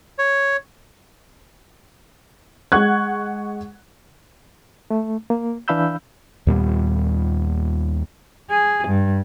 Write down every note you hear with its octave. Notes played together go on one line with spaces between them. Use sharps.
C#5
G#3 F#5 C#6 F#6 G#6
A3
A#3
E3 D4 F5 B5 E6 G6
D#2 A#2 G3 B3
G#4
G2